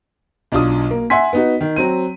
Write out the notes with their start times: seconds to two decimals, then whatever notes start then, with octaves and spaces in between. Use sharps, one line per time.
0.52 B1 D4 F4 D#6
0.91 A#3
1.10 E5 F#5 G#5 C6 B6
1.33 B3 D#4 F#4
1.61 D#3
1.76 F#3 C4 D#7